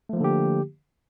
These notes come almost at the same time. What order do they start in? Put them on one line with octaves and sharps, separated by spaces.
A3 F3 A#3 D3 G4